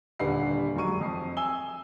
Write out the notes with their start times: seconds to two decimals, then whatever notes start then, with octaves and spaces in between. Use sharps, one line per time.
0.19 D#1 D3 G3 B4 F#5 C7
0.76 F1 F#3 G#3 C#6 D#7
1.01 F2 C7
1.37 G#5 E6 G7